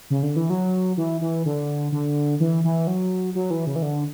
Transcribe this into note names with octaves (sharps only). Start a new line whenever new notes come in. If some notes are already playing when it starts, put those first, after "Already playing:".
C#3
D3
E3
F#3
E3
E3
D3
D3
E3
E3
F#3
F#3
E3
C#3
E3
D3